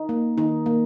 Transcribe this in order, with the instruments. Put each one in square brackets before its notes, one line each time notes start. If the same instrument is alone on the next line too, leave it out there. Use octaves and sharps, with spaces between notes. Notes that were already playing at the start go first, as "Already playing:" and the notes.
Already playing: [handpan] D#4
A#3
D#3 D#4
A#3